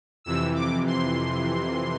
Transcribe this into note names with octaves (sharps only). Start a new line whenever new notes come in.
F2 C3 E3 E6
D6
C6